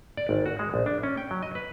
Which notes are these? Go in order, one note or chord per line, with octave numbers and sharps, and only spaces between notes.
D5
G#1
F#4
G#3
A#1
D4
C#4
G5
F#3
D#5
B4